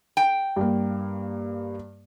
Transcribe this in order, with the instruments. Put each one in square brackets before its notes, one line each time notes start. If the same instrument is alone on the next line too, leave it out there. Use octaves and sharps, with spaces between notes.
[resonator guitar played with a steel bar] G5
[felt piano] G2 A#3